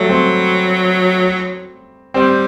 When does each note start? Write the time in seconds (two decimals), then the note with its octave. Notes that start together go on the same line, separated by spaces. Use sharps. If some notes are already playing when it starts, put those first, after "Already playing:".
Already playing: F#3 G3 A3
0.09 C4
2.14 G3 C4